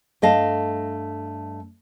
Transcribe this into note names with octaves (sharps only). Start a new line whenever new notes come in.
G2 A3 D#5 F5 A5